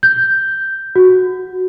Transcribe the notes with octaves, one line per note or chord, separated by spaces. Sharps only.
G6
F#4